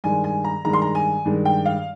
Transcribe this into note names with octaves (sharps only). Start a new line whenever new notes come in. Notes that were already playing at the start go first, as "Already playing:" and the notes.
G2 D#3 G#3 G#5
G#5
A#5
G2 D#3 G#3 A#5
C6
A#5
G#5
G2 D#3 G#3
G5
F5